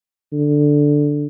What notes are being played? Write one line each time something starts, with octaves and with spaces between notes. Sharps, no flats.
D3